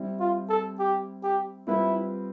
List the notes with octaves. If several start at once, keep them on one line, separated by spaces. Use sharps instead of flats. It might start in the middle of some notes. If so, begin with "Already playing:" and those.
Already playing: G3 C4 E4
F4
A4
G4
G4
G3 C4 E4 F4 B4